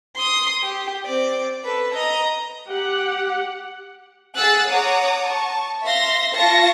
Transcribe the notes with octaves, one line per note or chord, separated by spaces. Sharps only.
C6 D#6
G4
C4 D5
A4 B4
D#5 A#5
G4 F#5
G#4 F#5 E6 F#6 A6
C#5 F#5 A#5 D6 D#6
A5 C#6
E5 F5 C6 A#6
F4 A5 C#6 A#6